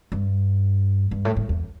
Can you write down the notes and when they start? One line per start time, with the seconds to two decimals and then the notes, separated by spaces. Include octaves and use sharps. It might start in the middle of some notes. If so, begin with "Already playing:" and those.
0.12 G2
1.11 G2
1.25 A2
1.37 A2
1.49 E2